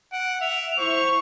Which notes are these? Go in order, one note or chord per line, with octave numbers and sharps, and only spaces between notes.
F#5 D7
E5 F7
E4 C5 C#6